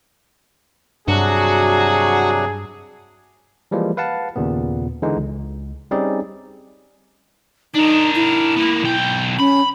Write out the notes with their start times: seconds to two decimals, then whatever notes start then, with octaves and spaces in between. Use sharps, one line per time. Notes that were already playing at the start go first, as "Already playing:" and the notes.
1.08 G2 C3 F#3 D4 F#4 G#4
3.71 E3 F3 G3 G#3 A#3
3.97 B4 F5 F#5 A5
4.36 D#2 A#2 C#3 B3
5.02 D3 E3 G#3 D#4
5.17 C#2
5.91 G3 C4 C#4 D#4 G#4 D5
7.74 D4 D#4 A#4
8.16 E4
8.56 A#3 B3
8.82 B1 G5
9.39 C#4 B5